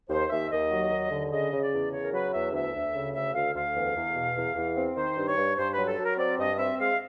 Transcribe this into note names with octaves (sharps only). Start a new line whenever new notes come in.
D#2 C5
D#2 E5
D#2 D#5
F#3
D#2
D3
C#3 D#5
C#3
D5
E2
C#3 C#5
A#4
F#3 B4
E2 E5
D2 E5
D2
C#3
D2 E5
D2 F5
D2 F5
E2
E2
B2
E2
E2
C4
D#3 C5
G2
C#5
G2
G2 C5
B4
F#3
A4
F#3
A#4
C4 D5
G2 D#5
C4 E5
G#3 F5